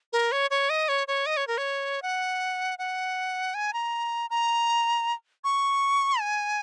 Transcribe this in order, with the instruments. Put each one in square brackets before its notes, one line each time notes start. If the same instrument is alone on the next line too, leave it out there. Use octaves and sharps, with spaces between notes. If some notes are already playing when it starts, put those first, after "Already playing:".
[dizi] A#4
C#5
C#5
D#5
C#5
C#5
D#5
C#5
A#4
C#5
F#5
F#5
G#5
A#5
A#5
C#6
G#5